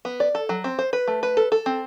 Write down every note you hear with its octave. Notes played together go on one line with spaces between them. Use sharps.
B3
D5
A4
F#3
C4
C5
B4
A3
B4
A4
A4
C4